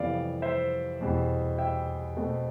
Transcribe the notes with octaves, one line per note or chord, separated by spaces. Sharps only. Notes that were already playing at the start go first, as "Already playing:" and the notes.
Already playing: F2 C3 E3 G3 B3 D5 F5
C5 E5
E2 B2 G3 C4
E5 G5
B2 A3 C4